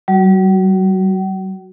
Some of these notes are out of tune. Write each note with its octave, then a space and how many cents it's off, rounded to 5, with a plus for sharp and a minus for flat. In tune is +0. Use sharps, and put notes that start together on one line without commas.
F#3 +45 F#4 +0